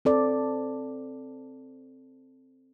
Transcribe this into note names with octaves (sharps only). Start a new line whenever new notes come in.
C4 A4 D5